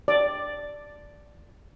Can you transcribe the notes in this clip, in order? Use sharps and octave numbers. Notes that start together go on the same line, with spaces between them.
D5